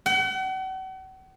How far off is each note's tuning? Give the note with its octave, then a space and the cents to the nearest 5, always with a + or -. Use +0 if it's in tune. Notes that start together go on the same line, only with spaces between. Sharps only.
F#5 +40